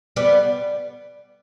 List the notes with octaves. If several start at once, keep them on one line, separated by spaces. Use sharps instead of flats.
G3 B3